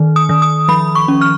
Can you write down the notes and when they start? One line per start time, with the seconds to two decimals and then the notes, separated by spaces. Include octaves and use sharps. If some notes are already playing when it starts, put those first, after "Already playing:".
Already playing: D#3
0.16 D#6
0.29 D#3
0.42 D#6
0.68 F3 B5
0.95 C#6
1.08 C#4
1.21 F6